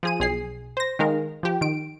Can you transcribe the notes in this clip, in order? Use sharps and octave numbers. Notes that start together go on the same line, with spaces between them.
F3 G#4 D#7
B1 G#4 C7
C5 A#6
D#3 G#3 A#4 F5
F3 G4
D#3 D7